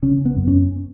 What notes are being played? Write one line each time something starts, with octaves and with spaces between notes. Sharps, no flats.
C#3 C#4
B3
F#2
C#4